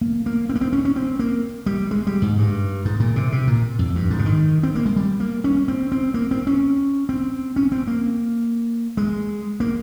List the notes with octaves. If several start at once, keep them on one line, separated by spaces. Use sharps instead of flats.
A#3
A#3
C4
A#3
C4
C#4
C#4
C4
A#3
G3
G#3
G3
G#2
G2
G#2
A#2
C3
C3
A#2
F2
G2
G#2
C#3
D#3
C4
A#3
G#3
G3
A#3
C#4
C4
C4
A#3
C4
C#4
C4
C#4
C4
A#3
G#3
A#3